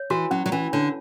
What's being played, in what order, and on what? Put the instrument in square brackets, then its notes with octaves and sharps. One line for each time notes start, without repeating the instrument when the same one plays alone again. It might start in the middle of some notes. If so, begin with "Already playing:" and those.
Already playing: [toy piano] C#5
[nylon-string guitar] E3 [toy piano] F#4
[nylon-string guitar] F#3 [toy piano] C#4
[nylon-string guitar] F#3
[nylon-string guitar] E3 [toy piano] C#4
[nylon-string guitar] D3 [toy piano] C#5